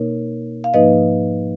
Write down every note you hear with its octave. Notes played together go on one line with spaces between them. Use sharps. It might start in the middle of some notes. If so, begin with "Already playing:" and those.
Already playing: B2 A#3 D#4 A#4 C#5
F5
G#2 F3 A#3 D#4 B4 D#5